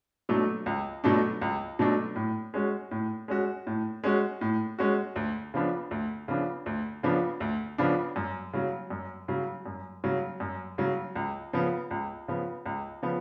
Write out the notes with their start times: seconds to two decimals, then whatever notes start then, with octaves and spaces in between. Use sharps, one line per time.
0.29 B2 F#3 A3 D4
0.66 C#2
1.04 B2 F#3 A3 D4
1.42 C#2
1.79 B2 F#3 A3 D4
2.16 A2
2.54 G#3 C#4 F#4
2.91 A2
3.28 G#3 C#4 F#4
3.67 A2
4.04 G#3 C#4 F#4
4.41 A2
4.78 G#3 C#4 F#4
5.16 D2
5.54 C#3 F3 B3 D4
5.91 D2
6.28 C#3 F3 B3 D4
6.66 D2
7.03 C#3 F3 B3 D4
7.40 D2
7.78 C#3 F3 B3 D4
8.16 F#2
8.53 C#3 F#3
8.90 F#2
9.28 C#3 F#3
9.66 F#2
10.04 C#3 F#3
10.40 F#2
10.78 C#3 F#3
11.16 C#2
11.53 C#3 F3 B3
11.91 C#2
12.28 C#3 F3 B3
12.66 C#2
13.03 C#3 F3 B3